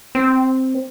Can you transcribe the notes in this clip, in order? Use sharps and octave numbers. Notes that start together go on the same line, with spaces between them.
C4